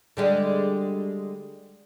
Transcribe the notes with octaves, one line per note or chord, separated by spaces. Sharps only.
D3 G3 G#3